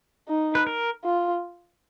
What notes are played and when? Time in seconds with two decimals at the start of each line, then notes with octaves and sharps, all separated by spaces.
0.28 D#4
0.55 B4
0.67 A#4
1.04 F4